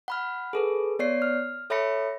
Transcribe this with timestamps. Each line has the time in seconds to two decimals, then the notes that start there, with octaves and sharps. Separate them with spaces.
0.08 F#5 B5 F6
0.53 G#4 A4 B4
0.99 B3 C#5 D5 C7
1.22 F6
1.70 A4 C#5 E5 B5 A#6 C#7